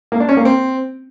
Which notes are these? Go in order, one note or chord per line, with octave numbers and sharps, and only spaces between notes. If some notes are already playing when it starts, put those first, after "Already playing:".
A#3
D4
C#4
A#3
C4